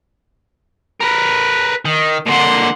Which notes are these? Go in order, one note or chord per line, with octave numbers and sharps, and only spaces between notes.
A#4 B4
D#3
A#2 D3 F#5 C6